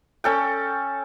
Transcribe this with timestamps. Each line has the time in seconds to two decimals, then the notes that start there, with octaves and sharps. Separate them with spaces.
0.24 C#4 A4 G5